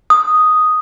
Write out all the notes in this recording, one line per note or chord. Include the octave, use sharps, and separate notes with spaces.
D#6